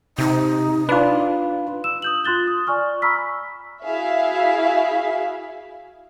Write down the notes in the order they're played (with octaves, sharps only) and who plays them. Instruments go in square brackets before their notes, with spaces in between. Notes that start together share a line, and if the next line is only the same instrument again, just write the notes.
[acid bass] C3 [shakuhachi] D#4
[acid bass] D4 [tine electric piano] F4 B4
[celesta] E6 E7
D#6 G6 F#7
F4 C6 F#6 A6 G7
D#6
D5 G#5 C#6 F6
A#5 B5 C#6 E6 F6 B6
[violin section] E4 F#4 G#4 E5 F5